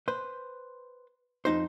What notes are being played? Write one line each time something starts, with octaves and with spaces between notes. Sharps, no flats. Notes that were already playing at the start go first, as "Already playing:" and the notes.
B4 C5
F2 D#4 C5